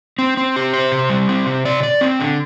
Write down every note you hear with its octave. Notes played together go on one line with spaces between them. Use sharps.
C4
C4
G4
C5
C3
G3
C4
C3
D5
D5
C4
D3